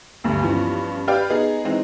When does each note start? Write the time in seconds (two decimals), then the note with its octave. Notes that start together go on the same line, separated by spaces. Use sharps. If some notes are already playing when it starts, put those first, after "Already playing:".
0.24 D2 G2
0.42 G2 E3 F3 B3 C#4
1.07 G4 B4 D5 F5 G5
1.29 B3 D#4 G#4
1.64 E3 G#3 C4 D#4